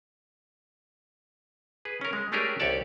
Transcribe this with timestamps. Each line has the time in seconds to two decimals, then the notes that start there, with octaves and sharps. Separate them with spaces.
1.85 G#4 B4
2.01 C#4 A#4
2.13 G#3
2.32 A3 C#4 D4 G4 G#4 A#4
2.60 C2 G4 A4 C#5 D5 A5